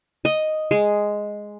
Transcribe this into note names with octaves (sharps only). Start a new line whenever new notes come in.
D#5
G#3